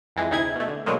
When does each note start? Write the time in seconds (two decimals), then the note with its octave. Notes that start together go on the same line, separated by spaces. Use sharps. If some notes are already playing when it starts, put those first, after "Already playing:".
0.16 F2 E3 G#3
0.31 D2 C3 D#4 E4 G#4 G#6
0.56 B2 A3
0.68 D3
0.86 B2 D3 D#3 F#3 G#3 A#3